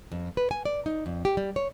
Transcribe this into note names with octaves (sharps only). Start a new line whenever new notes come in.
F2
B4
G#5
D5
D#4
F2
G4
G3
C#5